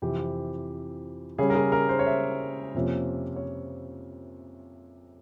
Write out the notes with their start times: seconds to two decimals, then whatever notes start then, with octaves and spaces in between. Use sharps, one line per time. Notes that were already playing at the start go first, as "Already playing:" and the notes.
0.02 F2 C3 E3 G4
1.38 C#3 G3 C#4 G#4
1.50 A#4
1.55 G#4
1.72 A#4
1.89 C5
1.99 C#5
2.07 E5
2.74 F2 C3 F3 A#3 C#4
3.36 C#5